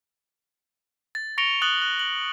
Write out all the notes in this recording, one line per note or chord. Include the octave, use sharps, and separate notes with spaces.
A6
C#6 A#6 C#7 D7 F7 G7
D#6 F#6 A6 F#7 G7
F#6
F#7